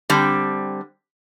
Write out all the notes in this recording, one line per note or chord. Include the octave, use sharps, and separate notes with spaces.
D3 G3 C4